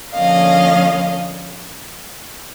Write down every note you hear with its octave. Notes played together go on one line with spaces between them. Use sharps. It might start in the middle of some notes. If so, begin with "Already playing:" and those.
D3 F3 A#3 C#4 D#5 F5